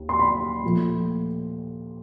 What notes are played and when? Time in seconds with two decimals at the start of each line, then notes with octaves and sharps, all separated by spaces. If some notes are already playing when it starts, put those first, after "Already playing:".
Already playing: D#2
0.09 C6
0.19 B5
0.63 A#2 F3 A3